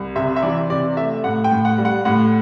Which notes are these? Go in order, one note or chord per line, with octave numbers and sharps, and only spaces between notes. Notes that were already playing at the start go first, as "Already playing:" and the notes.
Already playing: C2
C3 E5
E5
E3 D5
C3 D5
A3 E5
A2 F#5
G5
A2
F#5
G3
F#5
A2 F#5